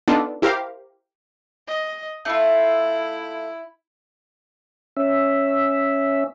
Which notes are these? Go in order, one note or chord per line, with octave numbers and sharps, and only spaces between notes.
B3 D4 D#4 F4 A4
E4 G4 A#4 C5 F5
D#5
A3 E4 F4
C#4 E5